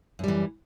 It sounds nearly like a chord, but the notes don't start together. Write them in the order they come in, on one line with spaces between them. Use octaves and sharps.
F#2 G3 E3